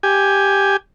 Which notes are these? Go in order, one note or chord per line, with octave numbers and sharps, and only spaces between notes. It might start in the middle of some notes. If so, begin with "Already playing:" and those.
G4 G#5